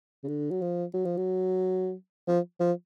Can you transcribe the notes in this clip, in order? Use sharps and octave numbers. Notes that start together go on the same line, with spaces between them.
C#3
D3
F#3
F3
F#3
F3
F#3
F3
F3